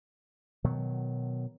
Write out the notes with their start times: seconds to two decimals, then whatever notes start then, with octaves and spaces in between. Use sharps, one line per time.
0.64 B2 D#3 F#3